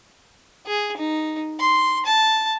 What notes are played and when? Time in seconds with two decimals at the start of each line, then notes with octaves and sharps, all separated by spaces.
0.67 G#4
0.97 D#4
1.60 C6
2.05 A5